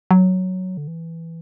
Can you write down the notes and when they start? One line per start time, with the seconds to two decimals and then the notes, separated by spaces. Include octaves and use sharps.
0.11 F#3
0.77 D3
0.88 E3